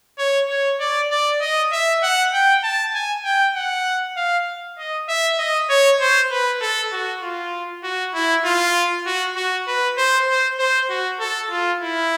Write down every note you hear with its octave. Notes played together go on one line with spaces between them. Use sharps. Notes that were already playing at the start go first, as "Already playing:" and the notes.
C#5
C#5
D5
D5
D#5
E5
F#5
G5
A5
G#5
G5
F#5
F5
D#5
E5
D#5
C#5
C5
B4
A4
F#4
F4
F#4
E4
F4
F#4
F#4
B4
C5
C5
C5
F#4
A4
F4
E4